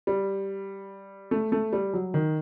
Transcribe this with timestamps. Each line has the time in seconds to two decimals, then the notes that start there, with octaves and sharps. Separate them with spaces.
0.07 G3
1.31 A3
1.52 A3
1.73 G3
1.93 F#3
2.14 D#3